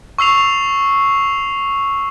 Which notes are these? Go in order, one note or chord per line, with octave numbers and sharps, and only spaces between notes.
C#6 E6 C7 F7